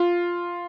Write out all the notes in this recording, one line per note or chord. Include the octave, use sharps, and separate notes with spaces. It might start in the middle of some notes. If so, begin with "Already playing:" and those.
Already playing: F4